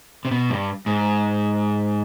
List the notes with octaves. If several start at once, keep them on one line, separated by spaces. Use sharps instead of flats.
C3
B2
G2
G#2